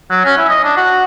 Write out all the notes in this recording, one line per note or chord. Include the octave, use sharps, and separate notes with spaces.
F#3
C#4
E4
D#5
D4
F#4